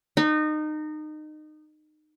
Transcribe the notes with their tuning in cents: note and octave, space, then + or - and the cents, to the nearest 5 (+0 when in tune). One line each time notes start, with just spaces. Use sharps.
D#4 -25